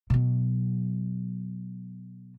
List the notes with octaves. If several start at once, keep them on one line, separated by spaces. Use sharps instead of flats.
B2 F#3